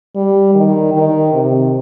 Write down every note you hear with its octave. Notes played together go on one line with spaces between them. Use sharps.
G3
D#3
D#3
C3